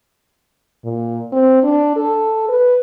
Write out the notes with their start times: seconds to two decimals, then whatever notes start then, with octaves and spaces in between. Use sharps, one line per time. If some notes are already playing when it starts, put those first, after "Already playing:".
0.84 A#2
1.32 C4
1.64 D4
1.96 A4
2.49 B4